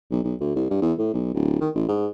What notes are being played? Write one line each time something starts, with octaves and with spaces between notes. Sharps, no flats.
B1
B1
D2
C2
G2
E2
A2
B1
D1
D#3
A1
G#2